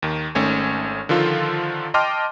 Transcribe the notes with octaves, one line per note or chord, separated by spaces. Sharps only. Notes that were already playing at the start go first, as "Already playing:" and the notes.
D#2 D#3
G#1 D#3 A3 C#4 C#5 G#5
D3 D#3 F3 F4 A4
D#5 G5 A5 C6 D6 F6